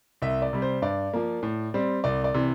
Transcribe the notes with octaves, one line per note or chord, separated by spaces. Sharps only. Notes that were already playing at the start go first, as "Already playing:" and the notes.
C2 E5
D5
C3 G3
C5
G2 D5
F3 A#3
A2
G3 C4
C2 D5
D5
C3 E3